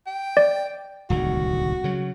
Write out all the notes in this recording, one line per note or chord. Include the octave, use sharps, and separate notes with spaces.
G5
D5
D1 C2 D#3 F#4
C#3 F#3